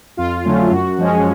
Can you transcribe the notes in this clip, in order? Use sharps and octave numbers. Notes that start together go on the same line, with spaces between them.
F2 F4
D3 F#3 A3 C#4
F#2 F#4
F3 G#3 C#4